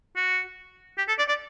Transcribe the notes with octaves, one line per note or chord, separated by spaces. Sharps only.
F#4
G4
A4
D5
D5